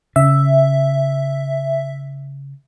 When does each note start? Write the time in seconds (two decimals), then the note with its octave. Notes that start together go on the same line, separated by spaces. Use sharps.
0.16 C#3 E5